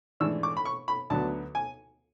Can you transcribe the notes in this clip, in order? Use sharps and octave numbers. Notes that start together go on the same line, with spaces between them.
G#2 E3 A3 D4 E6
D6
B5
C#6
B5
D2 D3 F#3 B3 A5
G#5